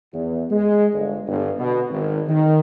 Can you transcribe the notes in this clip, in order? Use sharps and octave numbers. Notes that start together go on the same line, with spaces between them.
E2
G#3
G1
G1
B2
G#1
D#3